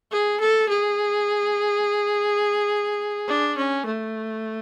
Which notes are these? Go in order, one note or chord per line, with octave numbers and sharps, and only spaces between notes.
G#4
A4
G#4
D4
C#4
A3